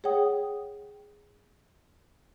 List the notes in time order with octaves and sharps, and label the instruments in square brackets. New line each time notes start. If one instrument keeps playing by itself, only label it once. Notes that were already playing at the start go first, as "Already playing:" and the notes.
[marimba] G#4 C#5 F#5 G5 D#6